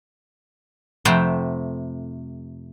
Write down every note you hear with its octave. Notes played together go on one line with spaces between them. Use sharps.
F2 C3 A3 F#5 G5 C6